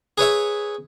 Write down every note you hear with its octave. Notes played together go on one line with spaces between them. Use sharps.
G#4 B4 C#5 E5